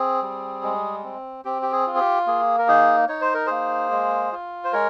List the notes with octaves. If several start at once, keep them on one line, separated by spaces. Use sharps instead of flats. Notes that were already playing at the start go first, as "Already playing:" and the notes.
Already playing: C4 G#4
G3
G#3
C4
C4 G4
G4
G#4
F4
G#4
G4
A#3 G#4
A#4
D#4 G#4
D#4 C#5
C5
A#4
A#3 G#4 C5
G#3
F4
C5
G#3 A#4 C#5